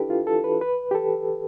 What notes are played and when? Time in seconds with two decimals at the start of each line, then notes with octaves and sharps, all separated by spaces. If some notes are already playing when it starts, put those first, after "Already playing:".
Already playing: D4 E4 G4 A4 B4
0.10 F4
0.27 A4
0.44 B4
0.61 B4
0.91 G4
0.95 A4